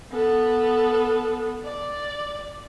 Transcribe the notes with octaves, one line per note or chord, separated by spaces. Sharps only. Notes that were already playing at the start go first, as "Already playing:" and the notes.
B3 A4
D5